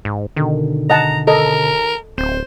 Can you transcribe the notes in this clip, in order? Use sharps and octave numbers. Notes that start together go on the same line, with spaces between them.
G#2
B2 D3 D#3
D#5 F#5 A5 A#5
A4 A#4 D#5
D1 C4 C5